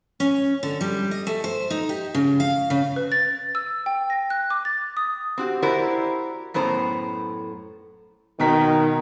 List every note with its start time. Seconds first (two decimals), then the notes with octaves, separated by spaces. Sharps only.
0.20 C#4
0.63 D3
0.81 G3
1.11 D#5
1.27 A3
1.44 C5
1.70 D#4
1.89 G4
2.15 C#3
2.40 F5
2.70 C#3
2.96 B4
3.12 A6
3.55 E6
3.86 G5
4.10 A#6
4.30 F#6
4.50 D6
4.65 A6
4.97 D#6
5.38 C4 F#4 G4
5.62 E4 F#4 G4 A#4 C5 D5
6.54 F#2 A2 B3 C5 A#5
8.40 B2 D#3 A#4 B6